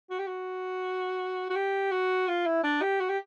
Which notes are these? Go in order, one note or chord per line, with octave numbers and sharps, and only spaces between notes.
F#4
G4
F#4
F#4
G4
F#4
F4
E4
D4
G4
F#4
G4